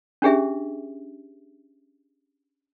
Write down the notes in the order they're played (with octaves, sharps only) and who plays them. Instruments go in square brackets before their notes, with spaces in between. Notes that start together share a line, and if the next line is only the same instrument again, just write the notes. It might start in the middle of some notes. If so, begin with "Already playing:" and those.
[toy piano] C#4 D4 G4 G#4 E5